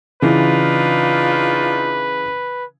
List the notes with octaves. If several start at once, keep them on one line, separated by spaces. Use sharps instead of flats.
C#3 E3 D4 D#4 F4 B4